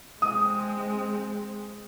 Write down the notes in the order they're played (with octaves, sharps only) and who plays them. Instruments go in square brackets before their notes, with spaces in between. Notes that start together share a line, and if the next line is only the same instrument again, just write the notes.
[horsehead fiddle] G#3 C4 [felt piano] D#6